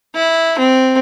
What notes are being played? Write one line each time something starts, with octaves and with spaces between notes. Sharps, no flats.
E4
C4